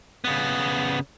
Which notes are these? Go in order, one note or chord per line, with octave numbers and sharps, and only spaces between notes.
C#3 B3